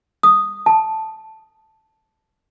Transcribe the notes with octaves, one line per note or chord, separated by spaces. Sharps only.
D#6
A5